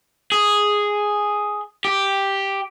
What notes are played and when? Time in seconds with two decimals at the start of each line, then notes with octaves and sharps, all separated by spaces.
0.32 G#4
1.85 G4